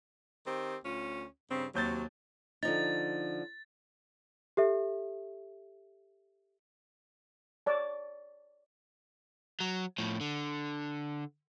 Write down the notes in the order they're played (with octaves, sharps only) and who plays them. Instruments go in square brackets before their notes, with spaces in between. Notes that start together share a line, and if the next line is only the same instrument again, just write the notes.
[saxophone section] D#3 C4 G4
D2 C#4 F4
G2 C#3 C4
[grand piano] D#2 G6 A6 [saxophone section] C3 F#3
[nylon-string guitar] D3 F3 D#4 [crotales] A6
[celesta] G4 A4 E5
[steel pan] C#5 D5 A5
[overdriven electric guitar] F#3
A2 F3
D3